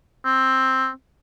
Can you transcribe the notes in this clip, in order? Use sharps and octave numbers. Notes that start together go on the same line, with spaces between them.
C4